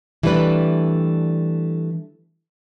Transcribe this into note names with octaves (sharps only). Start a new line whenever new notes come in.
E3 G3 A3 D4 B4